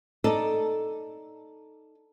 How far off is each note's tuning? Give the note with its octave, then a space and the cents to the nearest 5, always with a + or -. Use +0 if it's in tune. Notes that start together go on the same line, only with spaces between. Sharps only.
D#4 +0 A4 +0 D5 +0